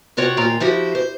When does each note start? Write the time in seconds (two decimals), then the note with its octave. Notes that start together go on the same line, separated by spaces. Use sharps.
0.17 C3 F4 F#4 C#5 G5
0.37 D#2 A#2 F4 G5 A#5
0.60 F3 E4 F#4 G4
0.95 C5